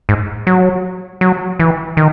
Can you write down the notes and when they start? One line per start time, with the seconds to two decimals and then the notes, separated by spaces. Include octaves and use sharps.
0.09 G#2
0.47 F#3
1.21 F#3
1.59 E3
1.97 D#3